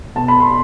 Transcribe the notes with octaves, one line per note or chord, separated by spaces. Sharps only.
B2 A5
B5
C6